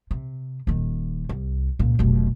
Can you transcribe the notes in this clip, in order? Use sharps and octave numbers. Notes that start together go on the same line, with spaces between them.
C3
D#1 D#3
C2
C#2 A#2
F1 B1